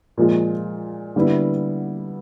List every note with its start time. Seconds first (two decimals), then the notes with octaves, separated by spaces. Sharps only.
0.17 A#2 F3 G#3
1.16 D3 G3 B3 E4